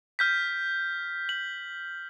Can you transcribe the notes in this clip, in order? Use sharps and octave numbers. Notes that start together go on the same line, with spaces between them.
F6 G6 B6
F#7